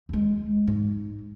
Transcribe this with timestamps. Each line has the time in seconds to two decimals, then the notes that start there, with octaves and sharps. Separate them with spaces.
0.09 D#2 G#3
0.67 G#2